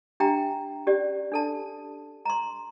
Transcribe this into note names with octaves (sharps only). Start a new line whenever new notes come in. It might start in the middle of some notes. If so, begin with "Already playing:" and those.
D4 G4 E5 G5 A#5
C#4 G4 D5
D4 A4 A5
A#5 C6